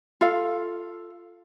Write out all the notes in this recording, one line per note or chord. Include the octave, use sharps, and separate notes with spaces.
F4 A4 F5